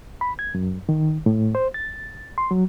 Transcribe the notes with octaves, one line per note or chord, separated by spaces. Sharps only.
B5
G#6
F#2
D#3
A2
C5
A6
C6
F#3